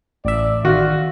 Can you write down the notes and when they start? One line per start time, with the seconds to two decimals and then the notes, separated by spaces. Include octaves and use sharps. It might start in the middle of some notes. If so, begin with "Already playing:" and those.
0.25 A1 D5 E5
0.65 D#3 F4 F#4